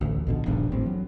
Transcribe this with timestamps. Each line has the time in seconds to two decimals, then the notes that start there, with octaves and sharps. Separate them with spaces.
0.01 A1 D2
0.27 A#1 B2 D3
0.46 D#1 A#1 G2 D4
0.72 A1 C4
0.86 F#3